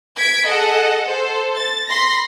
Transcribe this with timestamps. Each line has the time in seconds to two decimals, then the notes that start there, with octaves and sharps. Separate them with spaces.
0.16 G#6 B6 D7
0.48 G#4 A4 D#5 F#5
1.06 A4 C5
1.56 A6
1.87 B5 C6 A#6